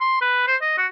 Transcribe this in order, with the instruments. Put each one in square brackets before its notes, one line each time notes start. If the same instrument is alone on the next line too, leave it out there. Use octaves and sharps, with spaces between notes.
[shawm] C6
B4
C5
D#5
F#4